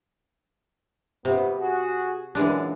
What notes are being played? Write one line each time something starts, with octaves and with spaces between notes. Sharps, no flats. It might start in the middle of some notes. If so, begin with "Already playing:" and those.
A#1 G2 C3 B3
F#4 G#4
F#2 A#2 E3 G#3 D4